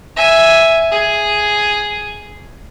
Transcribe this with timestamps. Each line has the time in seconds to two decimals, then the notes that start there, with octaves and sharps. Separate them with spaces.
0.17 E5 G#5
0.92 G#4